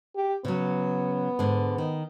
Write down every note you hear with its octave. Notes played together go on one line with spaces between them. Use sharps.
G4
C#3 F#3 B3
G#2 D3
D#3